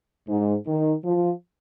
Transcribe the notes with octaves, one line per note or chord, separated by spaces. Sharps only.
G#2
D#3
F3